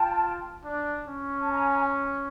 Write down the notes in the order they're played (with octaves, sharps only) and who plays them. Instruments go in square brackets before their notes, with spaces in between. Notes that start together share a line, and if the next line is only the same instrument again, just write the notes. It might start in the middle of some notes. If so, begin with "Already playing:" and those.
Already playing: [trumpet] F4 [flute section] G5 A5
[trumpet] D4
C#4
[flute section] A5
G#5 A#5